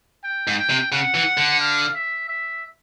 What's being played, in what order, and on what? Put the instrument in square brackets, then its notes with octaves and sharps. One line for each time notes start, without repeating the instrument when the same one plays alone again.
[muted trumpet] G5
[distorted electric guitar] G#2
[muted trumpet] G5
[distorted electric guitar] C3
[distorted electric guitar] C#3 [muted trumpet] F#5
[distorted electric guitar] E3
D3
[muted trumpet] F5
E5
E5